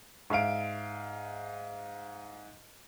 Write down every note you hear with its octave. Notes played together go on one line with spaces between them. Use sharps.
G#2 E5 F5 D7